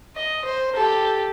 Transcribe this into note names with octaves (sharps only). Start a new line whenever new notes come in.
D#5
C5
G4 A4